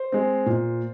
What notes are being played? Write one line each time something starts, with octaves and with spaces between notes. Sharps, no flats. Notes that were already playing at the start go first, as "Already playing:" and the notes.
Already playing: C5
G#3 C4
A#2